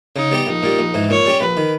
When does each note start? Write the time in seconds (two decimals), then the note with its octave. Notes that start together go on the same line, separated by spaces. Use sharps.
0.16 C#3 D#4
0.31 G3 B3 G4
0.47 A#1 D#4
0.63 A#2 G3
0.79 A#1
0.94 G#2 E3
1.10 A#2 C#5
1.26 G3 C#4 G4
1.41 A#1 B4
1.57 D#3